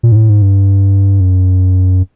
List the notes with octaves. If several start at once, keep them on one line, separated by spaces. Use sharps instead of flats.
A#2
G#2
A2
G#2
G2
F#2